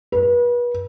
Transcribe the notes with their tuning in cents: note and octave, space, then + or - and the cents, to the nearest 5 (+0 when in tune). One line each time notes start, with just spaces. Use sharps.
B4 -35